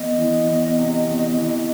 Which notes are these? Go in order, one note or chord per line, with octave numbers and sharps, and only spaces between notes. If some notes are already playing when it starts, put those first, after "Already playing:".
Already playing: E2 D#5
E3
E2
C3
E2
E3